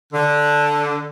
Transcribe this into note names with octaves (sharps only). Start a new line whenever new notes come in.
D3